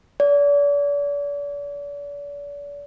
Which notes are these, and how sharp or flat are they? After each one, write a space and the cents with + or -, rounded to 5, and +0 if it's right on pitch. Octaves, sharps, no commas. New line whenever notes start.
D5 -40